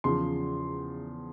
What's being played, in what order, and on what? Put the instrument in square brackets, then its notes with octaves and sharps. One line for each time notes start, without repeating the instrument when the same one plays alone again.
[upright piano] E2 C#3 F3 C6